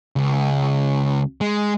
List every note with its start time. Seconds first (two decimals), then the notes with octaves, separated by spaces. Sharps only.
0.16 C#2
1.41 G#3